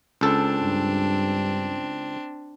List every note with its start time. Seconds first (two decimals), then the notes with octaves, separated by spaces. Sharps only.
0.21 C#2 C4 D4 A4
0.62 G2